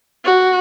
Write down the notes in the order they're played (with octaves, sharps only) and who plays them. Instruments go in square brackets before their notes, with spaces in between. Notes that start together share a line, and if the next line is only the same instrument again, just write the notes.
[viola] F#4